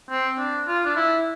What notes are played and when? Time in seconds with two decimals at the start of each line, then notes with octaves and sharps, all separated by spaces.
0.11 C4
0.39 D4
0.68 F4
0.85 D4
0.96 E4